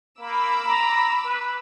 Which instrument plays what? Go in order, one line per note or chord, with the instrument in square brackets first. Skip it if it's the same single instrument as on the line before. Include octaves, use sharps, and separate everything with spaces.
[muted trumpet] A#3 [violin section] B5 D6 E6
[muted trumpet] A#5
B4